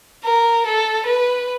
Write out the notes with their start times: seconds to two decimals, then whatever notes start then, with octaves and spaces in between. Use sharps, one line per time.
0.24 A#4
0.66 A4
1.06 B4